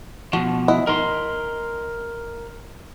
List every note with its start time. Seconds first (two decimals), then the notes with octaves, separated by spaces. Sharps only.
0.33 B2 F3 F#4
0.68 E4 D#5 F#5
0.87 D#4 A#4 C6